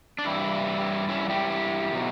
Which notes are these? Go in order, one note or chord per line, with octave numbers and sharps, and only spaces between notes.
D4
G2 E3 G3 E4
C#4 E4
E4 G4
B2 F#3